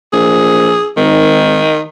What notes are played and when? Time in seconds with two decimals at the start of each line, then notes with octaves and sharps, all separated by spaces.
0.13 A#1 G#4
0.97 G#1 D#3